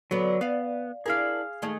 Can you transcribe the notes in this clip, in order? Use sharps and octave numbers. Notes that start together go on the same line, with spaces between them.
D3 F#3 B3
B3 D5 F5
D4 E4 G#4 A#4 F5
D#3 G#3 A3